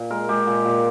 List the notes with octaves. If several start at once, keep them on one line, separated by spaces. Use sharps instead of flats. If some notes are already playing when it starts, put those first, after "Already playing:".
Already playing: A#2
G#3 A#4
G#3 G4
A#2
A#2